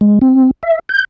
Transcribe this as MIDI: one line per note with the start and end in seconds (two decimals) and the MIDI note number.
0.01 0.19 56
0.21 0.51 60
0.63 0.79 76
0.89 1.04 91